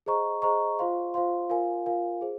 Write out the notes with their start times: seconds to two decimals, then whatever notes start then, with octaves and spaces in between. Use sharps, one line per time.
0.06 G#4 C5 D#5 A#5 C#6
0.42 G#4 C5 D#5 A#5 C#6
0.79 F4 C5 F5 C6
1.14 F4 C5 F5 C6
1.49 F4 A#4 F5 G#5
1.86 F4 A#4 F5 G#5
2.21 G#4 C5